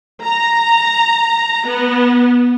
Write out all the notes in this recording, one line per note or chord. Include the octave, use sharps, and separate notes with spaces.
A#5
B3